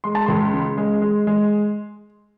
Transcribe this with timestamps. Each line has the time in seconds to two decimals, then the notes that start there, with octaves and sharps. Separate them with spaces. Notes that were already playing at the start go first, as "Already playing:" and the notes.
0.04 G#3 C6
0.15 A5
0.26 C#2 C6
0.54 C#3
0.78 G#3
1.02 G#3
1.27 G#3